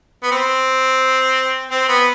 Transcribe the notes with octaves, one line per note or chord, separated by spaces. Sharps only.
B3
C4
C4
B3